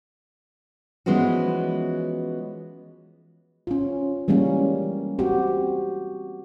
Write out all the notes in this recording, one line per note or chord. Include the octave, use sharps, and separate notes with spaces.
E3 F3 G#3 B3 C#4 F#4
C#4 F4
E3 G3 G#3 A#3 C#4
C4 F#4 G4